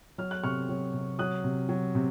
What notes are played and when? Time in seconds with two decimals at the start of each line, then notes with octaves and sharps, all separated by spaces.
0.18 F#3 F6
0.31 F#6
0.44 C3 C#6 F6
0.69 F#3
0.94 C3
1.19 F#3 D#6 F#6
1.44 C3
1.69 F#3
1.95 C3